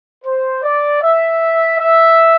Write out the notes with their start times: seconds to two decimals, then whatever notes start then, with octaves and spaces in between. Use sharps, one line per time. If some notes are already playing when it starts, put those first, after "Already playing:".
0.25 C5
0.63 D5
1.02 E5
1.79 E5